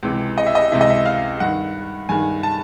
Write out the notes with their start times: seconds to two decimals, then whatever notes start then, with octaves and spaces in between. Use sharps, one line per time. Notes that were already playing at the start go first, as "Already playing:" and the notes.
0.03 C#2 C3 E3
0.38 D#5
0.47 E5
0.55 D#5
0.72 C#2 C3 E3 E5
0.81 D#5
0.90 E5
1.05 F5
1.40 G2 D#3 F#5
2.09 G2 D#3 G#5
2.43 A5